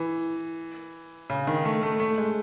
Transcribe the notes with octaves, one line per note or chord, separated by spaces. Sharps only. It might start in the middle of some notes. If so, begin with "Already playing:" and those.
Already playing: E3
C#3
D#3
A3
A3
A3
G#3